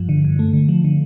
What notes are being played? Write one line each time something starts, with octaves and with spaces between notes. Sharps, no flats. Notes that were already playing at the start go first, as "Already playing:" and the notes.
Already playing: G2 F3
D3
G2
A3
D3
F3
D3